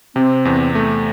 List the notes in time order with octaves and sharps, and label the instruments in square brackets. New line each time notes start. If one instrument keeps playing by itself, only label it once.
[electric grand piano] C3 [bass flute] C4
[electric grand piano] E2
A3